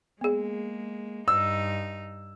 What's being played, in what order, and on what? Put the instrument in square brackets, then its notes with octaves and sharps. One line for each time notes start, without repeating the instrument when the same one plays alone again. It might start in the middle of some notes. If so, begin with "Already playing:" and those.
[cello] G#3 A#3 [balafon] B3 G#4
[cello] G2 D#4 [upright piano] E6